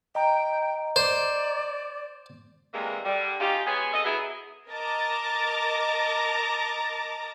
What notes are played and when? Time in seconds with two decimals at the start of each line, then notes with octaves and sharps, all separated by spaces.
0.15 D#5 G5 A#5
0.96 C5 D5
2.73 C3 E3 G3 G#3 A#3
3.05 D3 G3
3.40 C#4 D#4 F4 G4
3.66 G#3 B3 C#4 G#4
3.94 F2 A4 D#5
4.05 F#3 B3 E4 G#4
4.69 A#4 D#5 A5 A#5 D6 A6